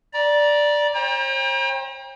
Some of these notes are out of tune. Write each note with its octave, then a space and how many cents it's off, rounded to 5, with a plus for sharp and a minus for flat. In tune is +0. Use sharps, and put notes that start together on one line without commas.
D5 +0 A#5 +30
C5 +45 G5 +35 A#5 +40